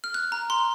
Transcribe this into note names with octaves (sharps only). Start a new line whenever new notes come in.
F6
F#6
A#5
C6